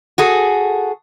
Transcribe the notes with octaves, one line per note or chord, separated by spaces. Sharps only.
F#4 G#4 A4